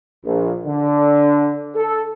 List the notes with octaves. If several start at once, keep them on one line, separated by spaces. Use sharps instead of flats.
A#1
D3
A4